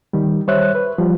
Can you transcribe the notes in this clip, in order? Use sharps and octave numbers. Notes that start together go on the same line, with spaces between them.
D#3 G3
G3 C5 C#5 E5 F#6
B4
F3 G3